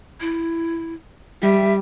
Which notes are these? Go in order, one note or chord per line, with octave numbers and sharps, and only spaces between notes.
E4
G3 E5